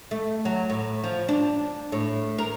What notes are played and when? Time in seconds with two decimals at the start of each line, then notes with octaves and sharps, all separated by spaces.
0.11 A3
0.45 F#3
0.70 A2
1.04 F3
1.29 D4
1.92 A2
2.38 A#4